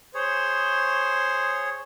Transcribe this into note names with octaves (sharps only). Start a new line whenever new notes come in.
G#4 C5 C#5